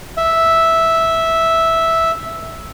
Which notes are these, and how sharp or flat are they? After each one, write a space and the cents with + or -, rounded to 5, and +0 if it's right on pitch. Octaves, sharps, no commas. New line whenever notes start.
E5 -5